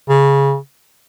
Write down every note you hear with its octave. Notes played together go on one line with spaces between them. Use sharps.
C#3